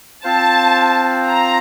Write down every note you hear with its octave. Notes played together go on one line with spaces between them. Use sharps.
C4 F4 C5 F5 A5
A#5